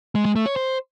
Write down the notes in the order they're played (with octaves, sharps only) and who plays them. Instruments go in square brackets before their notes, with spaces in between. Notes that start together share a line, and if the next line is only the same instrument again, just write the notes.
[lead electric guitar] G#3
G#3
A3
C#5
C5